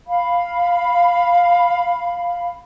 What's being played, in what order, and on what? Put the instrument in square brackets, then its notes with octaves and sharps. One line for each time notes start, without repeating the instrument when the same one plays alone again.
[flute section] F5 B5